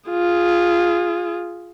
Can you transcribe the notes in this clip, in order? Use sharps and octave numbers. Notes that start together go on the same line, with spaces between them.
F4 G#4